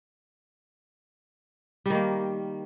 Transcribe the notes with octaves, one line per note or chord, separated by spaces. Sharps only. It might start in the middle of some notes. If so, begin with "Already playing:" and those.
D#3 G3 A#3